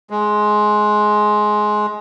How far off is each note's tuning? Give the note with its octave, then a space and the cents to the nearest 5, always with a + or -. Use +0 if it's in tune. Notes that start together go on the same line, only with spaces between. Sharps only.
G#3 +15